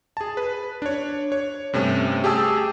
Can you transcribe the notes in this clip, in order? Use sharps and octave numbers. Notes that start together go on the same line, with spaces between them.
G#4 A5
B4
D4 C#5
C#5
G2 C3 A3 C#4
G4 G#4 G5 A5 E6